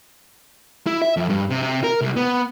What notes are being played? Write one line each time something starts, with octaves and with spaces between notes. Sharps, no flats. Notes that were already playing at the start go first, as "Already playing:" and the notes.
E4
E5
F2
G2
C3
C3
A#4
C2
B3